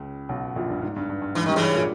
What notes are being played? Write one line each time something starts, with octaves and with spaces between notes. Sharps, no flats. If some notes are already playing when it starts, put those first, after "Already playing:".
Already playing: C#2 C#3
B1 B2
A#1 A#2
G2
G#2
G2
G2
G2
G#2 E3
G2 D#3 G3
C#3 E3
A#2 A#3